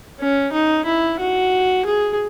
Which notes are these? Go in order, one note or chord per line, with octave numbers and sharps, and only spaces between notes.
C#4
D#4
E4
F#4
G#4